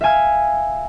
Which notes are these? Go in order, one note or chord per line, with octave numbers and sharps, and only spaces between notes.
E5 F5 G#5 F6